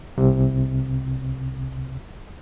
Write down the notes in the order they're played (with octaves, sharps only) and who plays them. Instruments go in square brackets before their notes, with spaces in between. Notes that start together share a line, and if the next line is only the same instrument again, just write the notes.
[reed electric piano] C2 C3